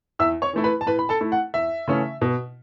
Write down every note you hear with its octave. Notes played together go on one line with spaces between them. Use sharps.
E2 E5 E6
C#5 C#6
E3 A3 E4
B4 B5
A5
A2 B4 B5
B5
A4 A5
A3 E4
F#5
E2 E5
C#3 E3 A3 C#4
B2